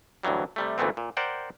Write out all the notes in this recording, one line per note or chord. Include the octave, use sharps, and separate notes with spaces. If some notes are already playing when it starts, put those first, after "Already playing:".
D2 G2 E3 F#3 G3
C3 G3 A3
D2 A#2 E3 A3 B3 C4
A#2
A#4 C5 D5 F#5 G5